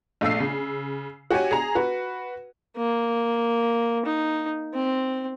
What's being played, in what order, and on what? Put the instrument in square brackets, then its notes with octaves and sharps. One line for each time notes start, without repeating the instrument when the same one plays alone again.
[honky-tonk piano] A#1 A3 F5 E6 C7
C#3
F#4 G4 C#5 G#5
G#4 A#5
F#4 B4
[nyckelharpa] A#3
D#4
C4